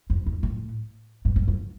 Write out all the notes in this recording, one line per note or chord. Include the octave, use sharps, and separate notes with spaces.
F2
E2
A2
G2
F#2
F#2